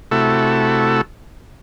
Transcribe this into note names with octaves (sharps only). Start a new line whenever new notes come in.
C3 A3 E4 F#4 A4